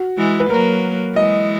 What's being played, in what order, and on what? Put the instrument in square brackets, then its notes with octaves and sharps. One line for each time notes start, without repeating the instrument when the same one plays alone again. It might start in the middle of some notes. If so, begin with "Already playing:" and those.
Already playing: [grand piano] F#4
[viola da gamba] E3 G#3
[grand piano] B4
[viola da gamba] F#3 A#3 [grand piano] A#4
[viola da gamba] E3 G#3 [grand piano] D#5